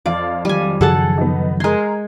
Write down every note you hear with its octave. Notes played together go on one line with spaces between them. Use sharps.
F2 D5 F5
D#3 F#3 G3 G#5
F#2 C#3 F3 F#4 G#4 A4 F#5 A5
B3 D#4
G#3 A#4 C6 G#6